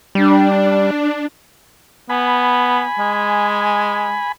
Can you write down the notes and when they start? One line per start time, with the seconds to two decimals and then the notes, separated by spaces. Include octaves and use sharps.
0.15 G3 D4
2.10 B3 G#5 B5
2.99 G#3